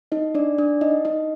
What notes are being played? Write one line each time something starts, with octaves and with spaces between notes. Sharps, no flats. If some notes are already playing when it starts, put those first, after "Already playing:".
D#4 D#5
D4 D5
D4 D5
D#4 D#5
D#4 D#5